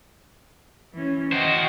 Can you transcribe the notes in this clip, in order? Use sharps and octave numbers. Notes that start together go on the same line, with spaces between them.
E3 C#4
F#4 C5 D#5 G5